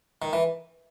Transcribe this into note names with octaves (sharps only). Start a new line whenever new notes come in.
D#3
E3